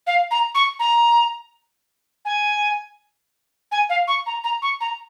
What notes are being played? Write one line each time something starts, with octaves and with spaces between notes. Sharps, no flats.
F5
A#5
C#6
A#5
G#5
G#5
F5
C#6
A#5
A#5
C#6
A#5